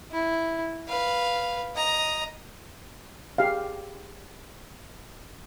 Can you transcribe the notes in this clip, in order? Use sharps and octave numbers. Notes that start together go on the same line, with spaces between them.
E4
B4 F5
D#5 A#5
G4 G#4 F5